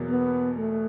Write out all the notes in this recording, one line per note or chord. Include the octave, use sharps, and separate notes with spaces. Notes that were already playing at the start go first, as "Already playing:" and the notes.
Already playing: E2 B2 F#3 A#3
B3
A3